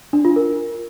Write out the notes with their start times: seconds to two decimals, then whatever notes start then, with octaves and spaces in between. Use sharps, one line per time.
0.13 D4
0.25 F4
0.36 A#4